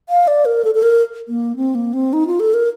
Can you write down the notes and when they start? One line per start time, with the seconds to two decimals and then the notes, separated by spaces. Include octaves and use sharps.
0.09 F5
0.28 D5
0.45 A#4
0.65 A4
0.75 A4
0.83 A#4
1.28 A#3
1.56 C4
1.75 A#3
1.93 C4
2.13 D#4
2.27 F4
2.40 A4
2.54 A#4